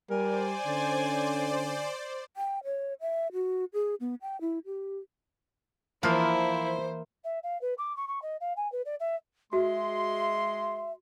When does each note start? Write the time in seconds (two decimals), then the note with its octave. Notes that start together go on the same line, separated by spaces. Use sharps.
0.10 G3 A#4 C5 D5 G#5
0.66 D3 C#4
2.36 G5
2.65 C#5
3.01 E5
3.33 F#4
3.73 G#4
4.01 B3
4.22 G5
4.41 E4
4.66 G4
6.03 E3 F3 A#3 E4 C5 F5
7.24 E5
7.43 F5
7.61 B4
7.78 D6
7.96 C#6
8.07 C#6
8.22 D#5
8.40 F5
8.56 G#5
8.72 B4
8.85 D5
8.99 E5
9.53 G#3 F#4 E5 C6